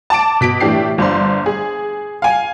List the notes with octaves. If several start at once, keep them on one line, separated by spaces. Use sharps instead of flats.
A5 D6 D7
B2 B6 D7
A2 E3 D4 G4 C7
G1 D4 C5 C6
G#4
F5 G#5